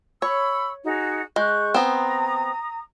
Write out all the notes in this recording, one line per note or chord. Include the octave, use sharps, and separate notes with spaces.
C#5 B5 C#6 E6
D#4 F#4 G#4
G#3 C#6 F#6 G6
B3 C4 A#5 D#6